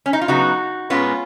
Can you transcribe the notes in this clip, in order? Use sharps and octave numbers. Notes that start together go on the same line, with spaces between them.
C#4
D#4
F4
C#3 F#3 B3 D#4 F#4
A#2 G#3 B3 C#4 F4